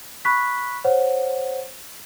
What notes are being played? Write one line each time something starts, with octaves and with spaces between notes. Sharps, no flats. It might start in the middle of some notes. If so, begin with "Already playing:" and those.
B5 C#6 F#6 B6
C5 C#5 F#5